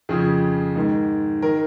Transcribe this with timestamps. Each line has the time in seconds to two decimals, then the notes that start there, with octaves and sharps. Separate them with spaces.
0.09 F2 C#3 F3 G#4
0.76 G#2 D#3
1.42 D#3 A#4